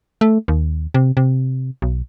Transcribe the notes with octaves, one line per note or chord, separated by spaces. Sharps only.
A3
D#2
C3
C3
B1